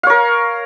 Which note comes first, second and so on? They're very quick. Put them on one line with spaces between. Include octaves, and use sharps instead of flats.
F5 C#5 A#4